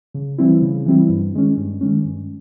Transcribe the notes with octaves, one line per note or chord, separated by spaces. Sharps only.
C#3
E3 G3 C4 E4
C#3
E3 G3 C4 E4
G2
D#3 G#3 C#4
G2
D#3 G#3 C#4
G2